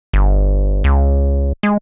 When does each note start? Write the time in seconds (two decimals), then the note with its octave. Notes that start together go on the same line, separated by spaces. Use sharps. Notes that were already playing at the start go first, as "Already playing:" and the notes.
0.13 G1
0.84 C#2
1.63 G#3